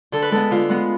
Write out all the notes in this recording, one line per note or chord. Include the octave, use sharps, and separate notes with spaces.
D3 A4
B4
G#3 B3 A4
D3 F4
G#3 B3